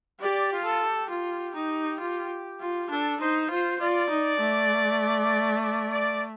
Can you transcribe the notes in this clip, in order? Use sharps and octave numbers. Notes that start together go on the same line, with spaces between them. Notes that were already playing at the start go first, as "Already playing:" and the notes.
G4 D5
F4
A4
G4
F4
D#4
F4
F4
D4 A4
D#4 C5
F4 C5
F4 D5
D#4
A3
D5
D5